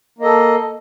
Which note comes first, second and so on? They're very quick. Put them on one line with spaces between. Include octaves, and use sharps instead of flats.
A#3 D#5 A4